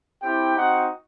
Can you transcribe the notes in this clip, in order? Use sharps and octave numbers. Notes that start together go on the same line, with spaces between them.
C4 E4 G4 G5
C4 D#4 F#4 F#5